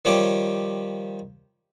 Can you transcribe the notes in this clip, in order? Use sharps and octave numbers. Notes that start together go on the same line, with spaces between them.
D#3 F3 G3 G4 C#5 D6